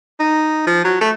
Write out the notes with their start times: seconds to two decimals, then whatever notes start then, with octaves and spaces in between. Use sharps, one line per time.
0.20 D#4
0.67 F3
0.84 F#3
1.01 A3